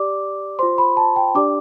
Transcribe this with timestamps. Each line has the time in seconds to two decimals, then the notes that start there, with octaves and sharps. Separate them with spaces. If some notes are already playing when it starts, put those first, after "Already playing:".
Already playing: G4 D5 D6
0.59 F4 C5 C6
0.78 B5
0.97 A5
1.16 G5
1.35 D4 G4 D5 D6